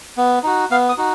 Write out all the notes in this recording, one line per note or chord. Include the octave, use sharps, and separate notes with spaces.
B3
D#4 F#4
B3 F5
D#6
D#4 F#4